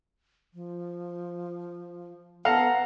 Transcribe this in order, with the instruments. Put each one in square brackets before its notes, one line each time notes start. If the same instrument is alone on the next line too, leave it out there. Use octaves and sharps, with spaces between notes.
[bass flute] F3
[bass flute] B3 [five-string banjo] A4 A5 [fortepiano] F5 [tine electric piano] F#5 A#5